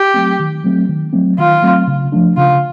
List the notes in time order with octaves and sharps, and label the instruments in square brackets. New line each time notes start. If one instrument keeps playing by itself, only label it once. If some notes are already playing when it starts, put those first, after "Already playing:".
Already playing: [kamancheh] G4
[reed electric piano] F#3 A3 C4
D#3
F#3 A3 C4
D#3
F#3 A3 C4
[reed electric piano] D#3 [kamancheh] F4
[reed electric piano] F#3 A3 C4
C#3
F3 A3 D4
[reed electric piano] C#3 [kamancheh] F4